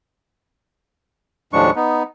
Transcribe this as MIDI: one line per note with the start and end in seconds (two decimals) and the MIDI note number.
1.53 1.71 39
1.53 1.71 45
1.53 1.71 53
1.53 1.71 56
1.53 1.71 62
1.53 1.71 85
1.76 2.03 59
1.76 2.03 63